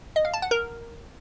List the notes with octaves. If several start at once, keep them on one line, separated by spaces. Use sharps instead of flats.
D#5
F5
A5
F#5
A#4